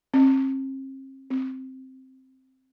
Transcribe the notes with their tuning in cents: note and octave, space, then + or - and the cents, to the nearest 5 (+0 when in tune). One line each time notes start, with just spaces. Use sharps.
C4 +40
C4 +0